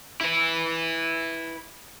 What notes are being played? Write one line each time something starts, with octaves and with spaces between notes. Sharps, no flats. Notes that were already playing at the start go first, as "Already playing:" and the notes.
E4 B4